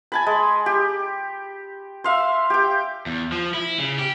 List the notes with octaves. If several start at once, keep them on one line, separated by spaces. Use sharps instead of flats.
G#5 A5 B5
G#3
G4
E5 F5 C6
G4 G5
E2
F3
E4
C#3
G4